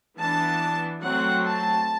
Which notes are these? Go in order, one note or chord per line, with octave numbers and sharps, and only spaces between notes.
E3 B3 D4 A5
F#3 A3 C4 F#5
A5